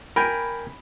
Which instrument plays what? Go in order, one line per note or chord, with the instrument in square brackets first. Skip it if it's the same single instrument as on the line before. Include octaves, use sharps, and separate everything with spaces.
[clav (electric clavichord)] A#4 G5 G#5 [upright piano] B5